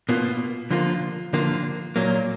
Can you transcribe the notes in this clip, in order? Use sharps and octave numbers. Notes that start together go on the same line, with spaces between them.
B2 A#3 F4
D3 F3 A#3 F4
D3 F3 A#3 F4
A#2 F#3 A#3